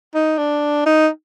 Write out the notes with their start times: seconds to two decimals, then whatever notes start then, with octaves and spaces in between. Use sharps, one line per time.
0.14 D#4
0.38 D4
0.86 D#4